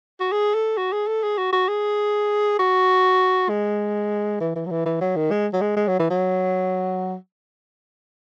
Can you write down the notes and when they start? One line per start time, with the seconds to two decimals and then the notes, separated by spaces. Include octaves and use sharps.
0.20 F#4
0.32 G#4
0.54 A4
0.77 F#4
0.92 G#4
1.07 A4
1.23 G#4
1.38 F#4
1.53 F#4
1.68 G#4
2.59 F#4
3.49 G#3
4.40 E3
4.55 E3
4.66 F#3
4.71 E3
4.86 E3
5.01 F#3
5.16 D#3
5.31 G#3
5.53 F#3
5.61 G#3
5.76 G#3
5.88 F#3
5.99 E3
6.10 F#3